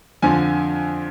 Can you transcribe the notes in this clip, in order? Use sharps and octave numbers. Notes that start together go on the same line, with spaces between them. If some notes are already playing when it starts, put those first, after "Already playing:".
F2 D3 F3 G#5